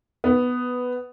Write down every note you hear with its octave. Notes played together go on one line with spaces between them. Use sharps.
B3